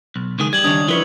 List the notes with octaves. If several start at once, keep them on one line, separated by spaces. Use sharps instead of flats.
B1
C#2 D#3 G#4
G3 G#6 F#7
D#3 C#4 D4 D#6
F3 E4 B4 C#5